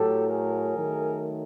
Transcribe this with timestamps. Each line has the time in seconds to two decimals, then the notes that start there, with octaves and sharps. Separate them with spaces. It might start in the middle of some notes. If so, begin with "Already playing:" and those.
Already playing: A2 F#3 A3 G4 A4
0.28 G#4 A#4
0.75 D#3 F#3 A3